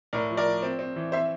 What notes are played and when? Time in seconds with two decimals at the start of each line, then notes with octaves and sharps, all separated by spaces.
0.13 A2 A#4 D5
0.30 F3
0.37 A#4 D5
0.46 F3
0.63 C4
0.79 C4
0.96 E3
1.12 C4 C5 E5